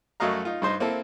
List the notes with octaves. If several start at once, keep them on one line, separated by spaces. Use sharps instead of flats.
F#2 F#3 A3 D#5 F5 A#5
D#4 F4
G2 D#4 C5
A#3 C4 E4 A4